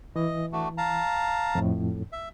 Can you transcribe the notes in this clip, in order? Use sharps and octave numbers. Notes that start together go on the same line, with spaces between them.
E3 D#5
A3 D4 F#4
F5 A5 A#5
F2 A2
E5